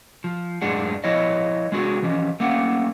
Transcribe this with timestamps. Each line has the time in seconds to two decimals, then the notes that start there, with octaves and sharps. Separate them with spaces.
0.24 F3
0.61 F#2 A2 G#3 D4 G#4 F#5
1.04 F3 E4 C#5 D#5
1.72 G#3 D4 F#4 G#4
2.03 E3 F3 C#4
2.40 A3 A#3 C#4 F#5